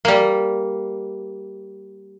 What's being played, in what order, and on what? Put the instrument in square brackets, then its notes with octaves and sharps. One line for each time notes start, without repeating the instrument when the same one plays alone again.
[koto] G3 A#3